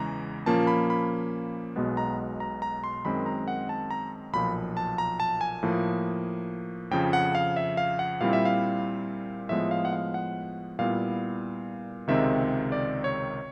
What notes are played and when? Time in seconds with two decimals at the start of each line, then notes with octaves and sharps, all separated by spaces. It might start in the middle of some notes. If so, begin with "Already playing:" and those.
Already playing: E2 C#3 E3 G#3 A#5
0.46 A#2 F3 A#3 C#4 A5
0.67 B5
0.90 B5
1.76 B1 B2 G#3 B3
1.97 A#5
2.40 A#5
2.62 A#5
2.84 C6
3.05 F#2 D#3 G#3 C4 B5
3.26 A#5
3.48 F#5
3.69 A5
3.91 A#5
4.33 B1 A#2 F3 B5
4.77 A5
4.98 A#5
5.20 A5
5.41 G#5
5.63 A2 F3 A#3
6.91 F2 C#3 F3 G5
7.13 F#5
7.35 F5
7.56 E5
7.77 F5
7.99 F#5
8.21 A#2 G3 C4 E4 F5
8.33 E5
8.45 F5
9.49 A2 F3 G#3 B3 E5
9.71 F5
9.85 F#5
9.93 F5
10.14 F#5
10.79 A#2 G3 B3 E4 F5
12.07 C#2 C3 D#3 G#3 C4 E5
12.72 D5
13.04 C#5